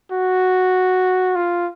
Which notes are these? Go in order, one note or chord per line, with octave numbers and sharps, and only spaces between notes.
F#4
F4